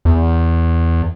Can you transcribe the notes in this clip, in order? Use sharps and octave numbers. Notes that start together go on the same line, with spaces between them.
E2